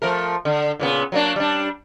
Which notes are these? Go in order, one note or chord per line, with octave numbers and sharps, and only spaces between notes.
F3 A3 A#4
D3
A#2 C#3 B3
F#3 A#3 D4
G3 D4